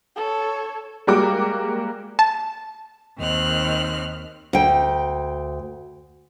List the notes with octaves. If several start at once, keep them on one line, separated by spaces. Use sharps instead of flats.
A4 C#5
G3 G#3 A#3 F#4 G5 D6
A5
D#2 D#3 C4 F6 F#6
D2 G5